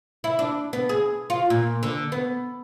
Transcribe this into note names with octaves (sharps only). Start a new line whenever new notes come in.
E4
D4
B3
G#4
F4
A#2
D3
B3